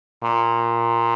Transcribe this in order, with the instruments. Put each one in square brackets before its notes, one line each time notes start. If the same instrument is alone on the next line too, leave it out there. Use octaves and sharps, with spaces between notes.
[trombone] A#2